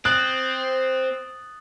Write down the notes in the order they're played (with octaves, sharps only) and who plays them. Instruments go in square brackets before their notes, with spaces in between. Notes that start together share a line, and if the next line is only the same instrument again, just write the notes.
[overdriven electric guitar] C4 [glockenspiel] D#6 A6 F#7 [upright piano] F#6